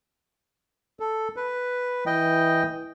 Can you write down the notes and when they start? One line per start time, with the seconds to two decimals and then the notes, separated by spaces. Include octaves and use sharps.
1.00 A4
1.36 B4
2.06 E3 D#5 G5